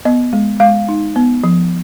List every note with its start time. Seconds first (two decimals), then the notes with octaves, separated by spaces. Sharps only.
0.05 B3 D#5
0.33 G#3
0.60 G#3 F5
0.89 D#4
1.16 B3
1.44 F3